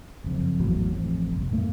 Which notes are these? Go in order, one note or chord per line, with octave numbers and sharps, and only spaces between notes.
F#1 F2
G#1 E2 A2 F#3
A1 F2
F#1 C2
F#2 A2 A3 A#3